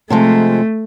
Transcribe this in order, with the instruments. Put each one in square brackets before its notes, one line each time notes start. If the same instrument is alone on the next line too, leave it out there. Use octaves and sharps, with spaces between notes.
[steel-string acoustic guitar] C3 F3 G#3 [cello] A3